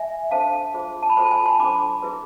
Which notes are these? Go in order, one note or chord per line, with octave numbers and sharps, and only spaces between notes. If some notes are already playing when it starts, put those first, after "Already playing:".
Already playing: E5 G#5
D4 A4 C5 F5 A5
F4 G#4 C5
A5
B5
F4 A4 C5 A5 C6
G#5 B5
A5 C6
D4 A4 C5 B5 D6
E4 G#4 B4